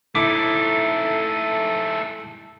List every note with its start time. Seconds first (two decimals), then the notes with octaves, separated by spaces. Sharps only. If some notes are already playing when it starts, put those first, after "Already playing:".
0.15 A3 D#4 E4 A4 D6